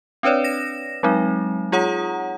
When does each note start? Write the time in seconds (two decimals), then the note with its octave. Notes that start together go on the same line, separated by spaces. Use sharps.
0.23 C4 D4 B4 C#5 D5
0.44 A#6 E7
1.03 F#3 G#3 C4 D#4
1.72 F4 G#4 C#5 F#5 A#5 D#6